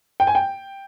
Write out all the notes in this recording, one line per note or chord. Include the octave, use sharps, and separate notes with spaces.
G5
G#5
G5